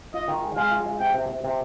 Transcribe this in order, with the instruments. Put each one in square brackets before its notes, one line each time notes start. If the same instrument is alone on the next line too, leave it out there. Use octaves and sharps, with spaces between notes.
[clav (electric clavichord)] F4 [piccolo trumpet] D#5
[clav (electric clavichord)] D#3
G#3
[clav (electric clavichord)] G#3 [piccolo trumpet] F5
[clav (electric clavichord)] F4
G#3
[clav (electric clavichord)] C3 [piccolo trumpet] G5
[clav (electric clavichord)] C3
C3
C3